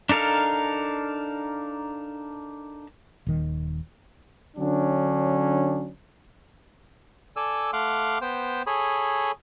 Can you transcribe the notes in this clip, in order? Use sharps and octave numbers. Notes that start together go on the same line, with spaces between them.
D4 D#4 A4 A#4 F5
D#1 D#3
D3 F#3 C#4 D4
A4 D5 G#5 E6
A3 F5 F#5 C6 D6
B3 C5 G5
G#4 A4 C#5 B5 D#6